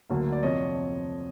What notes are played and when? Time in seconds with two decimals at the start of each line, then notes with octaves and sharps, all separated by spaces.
0.10 D2 D3 F#3 A#3
0.32 D5
0.43 F2 C3 F3 C#5 D#5